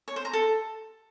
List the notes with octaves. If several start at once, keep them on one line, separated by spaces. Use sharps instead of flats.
C#5
C5
A#5
A4